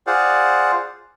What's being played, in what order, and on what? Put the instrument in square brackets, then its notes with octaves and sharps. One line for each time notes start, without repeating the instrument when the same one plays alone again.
[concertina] F4 G#4 C5 D5 F5 F#5